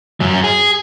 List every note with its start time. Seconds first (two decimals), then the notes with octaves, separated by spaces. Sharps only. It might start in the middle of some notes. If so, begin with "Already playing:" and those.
0.20 F#2 F#3
0.44 G#4